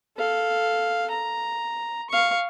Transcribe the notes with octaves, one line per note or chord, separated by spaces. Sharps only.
A4 F5
A#5
F5 C#6